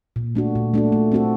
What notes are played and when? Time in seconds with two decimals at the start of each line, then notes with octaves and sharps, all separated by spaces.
0.16 A#2
0.35 A3 D4 F#4
0.55 A#2
0.74 A3 D4 F#4
0.92 A3
1.12 C4 F#4 A4